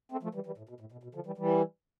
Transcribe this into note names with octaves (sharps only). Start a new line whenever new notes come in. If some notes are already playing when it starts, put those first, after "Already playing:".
A3 C4
F3 A3
E3 G3
E3 G3
A2
B2
A2
B2
B2
D3 F3
E3 G3
E3 G3